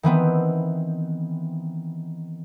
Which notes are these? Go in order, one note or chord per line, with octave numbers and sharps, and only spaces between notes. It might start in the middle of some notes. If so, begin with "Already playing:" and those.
D#3 E3 B3 C4